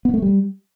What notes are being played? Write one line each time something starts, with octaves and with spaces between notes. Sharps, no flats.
B3
A3
G3